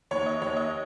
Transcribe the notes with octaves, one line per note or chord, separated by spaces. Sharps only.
D#2 C#5
D#5
D#2 C#5
D#5